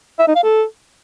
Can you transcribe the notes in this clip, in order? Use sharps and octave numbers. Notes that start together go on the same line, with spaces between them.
E5
D#4
F5
A4